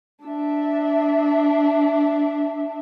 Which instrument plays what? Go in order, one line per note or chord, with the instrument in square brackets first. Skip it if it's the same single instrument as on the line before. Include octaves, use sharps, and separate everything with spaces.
[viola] D4 E5